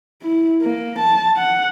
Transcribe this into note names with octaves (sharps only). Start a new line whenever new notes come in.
E4
A#3
A5
F#5